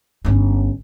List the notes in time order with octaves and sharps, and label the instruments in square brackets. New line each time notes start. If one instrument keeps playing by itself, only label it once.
[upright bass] G1 C#4